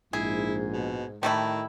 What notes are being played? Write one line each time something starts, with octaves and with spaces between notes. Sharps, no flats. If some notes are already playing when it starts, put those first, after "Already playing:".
A#1 G#2 E4 G#4
B2
A2 D#3 G3 A3 E4